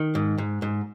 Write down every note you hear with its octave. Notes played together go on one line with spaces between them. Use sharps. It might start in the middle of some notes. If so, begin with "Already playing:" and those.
Already playing: D#3
G#2
G#2
G#2